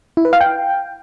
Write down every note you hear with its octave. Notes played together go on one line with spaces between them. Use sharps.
E4
B4
F5
G5